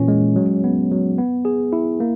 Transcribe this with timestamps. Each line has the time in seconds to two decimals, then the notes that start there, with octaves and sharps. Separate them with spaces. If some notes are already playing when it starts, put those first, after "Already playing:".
Already playing: A#2 E3 C#4
0.08 G#3
0.36 F#3
0.64 B3
0.91 F#3
1.18 B3
1.45 G#4
1.73 E4
2.00 A#3